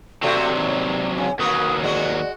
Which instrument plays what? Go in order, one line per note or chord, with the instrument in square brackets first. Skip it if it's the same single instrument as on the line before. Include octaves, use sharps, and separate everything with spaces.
[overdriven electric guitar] C3 F#3 [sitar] A3 C4 F#4 [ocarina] D5
[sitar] D#2
[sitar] C#3 [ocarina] G#5
[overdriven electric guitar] D#2 F#3 [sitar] A#3 A#4 B4 [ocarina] D#6
[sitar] G#3 F#4 [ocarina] D5